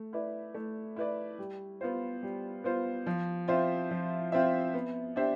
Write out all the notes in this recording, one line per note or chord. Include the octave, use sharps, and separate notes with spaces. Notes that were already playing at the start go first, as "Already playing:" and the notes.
Already playing: A3
E4 B4 D5
A3
E4 B4 D5
G3
B3 F4 C5
G3
B3 F4 C5
F3
C4 F4 C5 E5
F3
C4 F4 C5 E5
B3
D4 G4 C5 E5